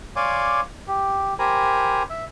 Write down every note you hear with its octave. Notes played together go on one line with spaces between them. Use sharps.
C#5 D5 F5 G#5 C6 D6
G4
G4 A#4 C5 G#5 A#5 B5
E5